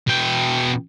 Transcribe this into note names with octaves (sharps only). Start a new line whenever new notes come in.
B2 G5